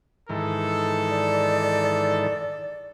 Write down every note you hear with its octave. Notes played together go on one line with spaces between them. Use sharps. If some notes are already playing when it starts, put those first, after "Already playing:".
G#2 D#3 E3 A4
D5